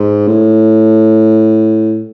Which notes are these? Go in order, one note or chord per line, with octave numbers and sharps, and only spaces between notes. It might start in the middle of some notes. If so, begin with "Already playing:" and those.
Already playing: G#2
A2